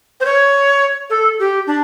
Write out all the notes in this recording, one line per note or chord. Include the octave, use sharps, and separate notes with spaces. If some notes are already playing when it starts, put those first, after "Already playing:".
C5
C#5
A4
G4
D4